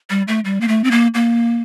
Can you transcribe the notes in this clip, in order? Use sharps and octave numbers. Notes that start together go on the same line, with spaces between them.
G3
A3
G3
A#3
A3
C4
A#3
A#3